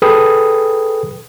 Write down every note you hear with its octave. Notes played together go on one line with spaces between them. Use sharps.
G#4 A4 B4 G5 B5 D#6